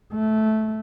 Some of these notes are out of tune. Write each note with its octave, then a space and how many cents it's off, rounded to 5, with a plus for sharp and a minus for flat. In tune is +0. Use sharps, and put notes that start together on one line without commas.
A3 -15